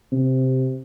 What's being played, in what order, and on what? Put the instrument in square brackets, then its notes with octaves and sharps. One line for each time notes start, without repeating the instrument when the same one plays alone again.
[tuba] C3